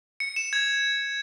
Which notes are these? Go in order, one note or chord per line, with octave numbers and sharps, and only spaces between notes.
C#7
E7
G#6